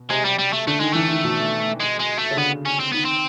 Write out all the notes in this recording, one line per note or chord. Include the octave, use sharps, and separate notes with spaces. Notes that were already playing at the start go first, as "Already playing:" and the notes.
Already playing: B2
C3 G#3
G3
G3
A3
D3 A3
D#3 G#3
E3 A3
D#3
B2
G#3
G#3
A3
C#3
D3 B3
C#4
C4
D#3 B3
C4